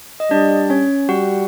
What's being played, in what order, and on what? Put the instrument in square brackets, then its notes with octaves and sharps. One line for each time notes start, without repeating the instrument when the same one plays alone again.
[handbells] D#5
[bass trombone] G3 [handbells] D4 D5
[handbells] C#4 C#5
[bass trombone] G3 [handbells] F#4 F#5